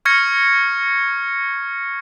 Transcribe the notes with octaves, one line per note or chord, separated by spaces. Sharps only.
C#6 F6 G#6 A#6 C#7